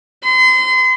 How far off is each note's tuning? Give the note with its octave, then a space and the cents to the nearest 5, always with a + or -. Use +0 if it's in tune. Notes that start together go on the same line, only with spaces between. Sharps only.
C6 -35